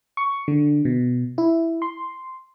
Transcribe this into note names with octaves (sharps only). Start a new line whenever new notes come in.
C#6
D3
B2
E4
C6